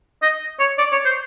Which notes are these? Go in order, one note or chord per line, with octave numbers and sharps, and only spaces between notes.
D#5
C#5
D5
C#5
C5